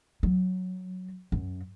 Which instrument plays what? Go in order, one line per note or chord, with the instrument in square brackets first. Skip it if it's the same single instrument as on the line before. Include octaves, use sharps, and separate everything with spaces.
[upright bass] F#3
F#2